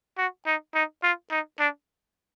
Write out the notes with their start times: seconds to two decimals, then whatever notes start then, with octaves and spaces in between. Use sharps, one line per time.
0.18 F#4
0.46 D#4
0.75 D#4
1.03 F4
1.31 D#4
1.60 D4